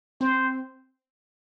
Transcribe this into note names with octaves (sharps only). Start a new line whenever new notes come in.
C4 C5